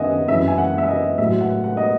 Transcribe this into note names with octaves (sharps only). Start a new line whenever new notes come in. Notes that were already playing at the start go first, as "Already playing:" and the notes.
Already playing: F#2 D#3 D#5 E5 F#5 G#5
F#2 E3 E5
G#5
F#5
E5
D#5
A2 F#3 E5
F#5
F#5
D#5